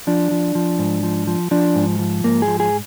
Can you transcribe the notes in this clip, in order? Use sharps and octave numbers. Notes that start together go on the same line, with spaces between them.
F3 D4
F3
F3
G#2
F3
F3
F3 D4
G#2
F3
G#2 A#3
G#4
F3
G#4